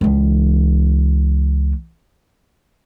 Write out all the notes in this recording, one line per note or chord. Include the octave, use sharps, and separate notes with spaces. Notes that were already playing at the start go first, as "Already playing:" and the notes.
C#2 E3